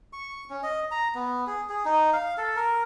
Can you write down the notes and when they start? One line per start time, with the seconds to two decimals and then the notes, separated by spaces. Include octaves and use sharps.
0.13 C#6
0.50 C#4
0.63 D#5
0.91 A#5
1.15 B3
1.47 G#4
1.69 G#4
1.85 D#4
2.13 F5
2.38 A4
2.56 A#4